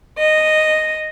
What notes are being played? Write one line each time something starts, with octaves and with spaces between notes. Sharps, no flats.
D#5